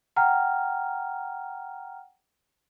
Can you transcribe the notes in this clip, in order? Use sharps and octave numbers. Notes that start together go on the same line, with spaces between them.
F#5 G5 A#5 F6